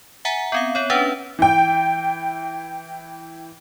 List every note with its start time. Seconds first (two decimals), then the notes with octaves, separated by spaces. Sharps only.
0.25 E5 F#5 G#5 A#5
0.52 B3 C4 F5
0.75 B3 C#5
0.90 C#4 D4 B4 F#5
1.39 E3 G5